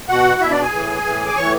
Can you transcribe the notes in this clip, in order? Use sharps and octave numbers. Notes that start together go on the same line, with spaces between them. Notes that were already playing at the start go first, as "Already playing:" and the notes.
B2 F#4 F#5
B2 E4 E5
D4 D5
G#4 G#5
A2 E3
A2 E3
D6
A2 E3 C#5 C#6